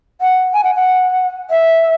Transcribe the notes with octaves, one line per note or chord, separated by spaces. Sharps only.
F#5
G#5
F#5
F#5
E5